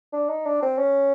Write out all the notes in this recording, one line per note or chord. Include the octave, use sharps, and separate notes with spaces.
D4
D#4
D4
C4
C#4